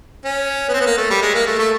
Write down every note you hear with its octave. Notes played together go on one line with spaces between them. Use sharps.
C#4
B3
C4
B3
A#3
A3
G3
G#3
A#3
A3
A3